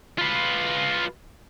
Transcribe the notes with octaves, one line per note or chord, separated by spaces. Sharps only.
F4 B4